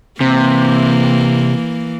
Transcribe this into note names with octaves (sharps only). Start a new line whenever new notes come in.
C3 E3 A#3